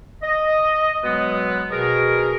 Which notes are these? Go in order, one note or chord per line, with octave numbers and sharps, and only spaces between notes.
D#5
B2 F#3 G#3 B3
B2 G#4 A#4